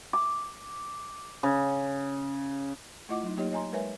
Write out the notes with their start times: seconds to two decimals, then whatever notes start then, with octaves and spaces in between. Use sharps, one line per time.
0.13 D6
1.43 C#3
3.09 A3 E4 F4 D#5 F#5 D6
3.23 F#3 D#4
3.37 F#3 A#3 D#4 G4 C#5 D#5
3.52 C#5 D#5 G#5 A#5 C6
3.72 G#3 A#4 B4 C#5 E5 G#5